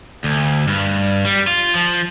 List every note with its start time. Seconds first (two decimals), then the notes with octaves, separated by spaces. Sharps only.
0.24 D2
0.67 G2
1.25 G3
1.47 F4
1.75 F3